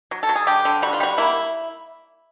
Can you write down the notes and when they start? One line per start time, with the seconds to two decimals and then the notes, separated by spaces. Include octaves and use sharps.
0.11 F#3
0.23 A4
0.29 F#3
0.35 G#4
0.47 D3 G4
0.65 D3
0.82 G3 F#4
0.93 F4
1.00 G3 F#4
1.18 A#3 E4